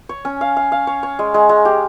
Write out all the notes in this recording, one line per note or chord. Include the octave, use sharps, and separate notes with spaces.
C#5
C#4
F5
F5
F5
C#5
C#5
G#3
G#3
G#3
G4